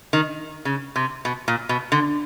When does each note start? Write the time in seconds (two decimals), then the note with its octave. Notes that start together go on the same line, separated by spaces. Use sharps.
0.13 D#3
0.65 C#3
0.96 C3
1.25 B2
1.48 A#2
1.69 B2
1.92 D3